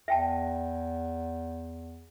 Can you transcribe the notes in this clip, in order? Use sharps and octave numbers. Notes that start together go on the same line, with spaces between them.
E2 E5 G5 A5